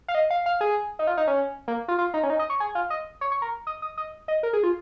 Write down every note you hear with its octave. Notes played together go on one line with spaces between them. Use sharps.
F5
D#5
F5
F5
G#4
D#4
F4
D#4
C#4
A#3
F4
F4
D#4
C#4
D#4
D#5
C#5
G#4
F4
D#5
C#5
C#5
A#4
D#5
D#5
D#5
D#5
A#4
G#4
F4